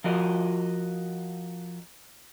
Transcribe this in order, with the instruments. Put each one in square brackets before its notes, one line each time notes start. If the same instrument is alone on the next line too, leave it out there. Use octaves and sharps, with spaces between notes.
[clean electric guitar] F3 F4 F#4 A#4 D#5